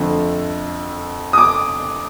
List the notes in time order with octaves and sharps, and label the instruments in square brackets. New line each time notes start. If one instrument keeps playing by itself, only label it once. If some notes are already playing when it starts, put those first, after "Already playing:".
Already playing: [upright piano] F2 D3 A3
D#6
D6